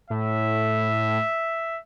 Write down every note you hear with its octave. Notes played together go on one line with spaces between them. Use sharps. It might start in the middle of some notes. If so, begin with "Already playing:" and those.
A2 E5